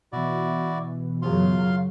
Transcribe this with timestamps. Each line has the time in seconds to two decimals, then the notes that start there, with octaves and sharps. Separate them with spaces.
0.13 B2 E3 E4 F#4 D5
1.22 F#2 C#3 F#3 F4 F5 C6